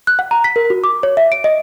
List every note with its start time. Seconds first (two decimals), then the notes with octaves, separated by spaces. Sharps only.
0.07 F#6
0.19 F#5
0.31 A#5
0.44 B6
0.56 A#4
0.70 F#4
0.84 D6
1.03 C#5
1.17 E5
1.32 D7
1.44 D#5